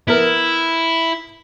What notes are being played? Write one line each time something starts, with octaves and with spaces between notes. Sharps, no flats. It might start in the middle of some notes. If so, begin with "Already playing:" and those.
B3 E4 A#4